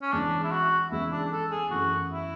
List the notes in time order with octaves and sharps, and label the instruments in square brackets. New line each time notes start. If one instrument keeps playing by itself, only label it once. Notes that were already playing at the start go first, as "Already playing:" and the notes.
[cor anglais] C#4
[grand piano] E2 C#3 E3 G#3 [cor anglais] D4
[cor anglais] E4
F#4
[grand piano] E2 C#3 E3 G#3 [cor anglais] E4
[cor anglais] D4
A4
G#4
[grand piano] F#2 E3 A3 [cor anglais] F#4
[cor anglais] E4